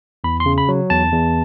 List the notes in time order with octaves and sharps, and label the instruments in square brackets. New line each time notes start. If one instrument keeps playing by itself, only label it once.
[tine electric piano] E2 B5
C6
C#3
B5
F#3
E2 A5
E2